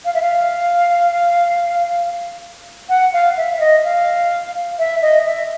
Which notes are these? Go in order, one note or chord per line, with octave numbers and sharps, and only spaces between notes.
F5
E5
F5
F#5
F5
E5
E5
D#5
F5
E5
D#5
E5